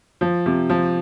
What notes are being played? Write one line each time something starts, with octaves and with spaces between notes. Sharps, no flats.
F3
C3
F3